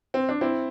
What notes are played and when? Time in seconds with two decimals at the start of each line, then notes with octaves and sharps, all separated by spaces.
0.14 C4
0.29 D4
0.41 C4 E4